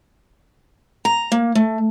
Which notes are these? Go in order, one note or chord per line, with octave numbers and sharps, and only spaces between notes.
A#5
A#3
A3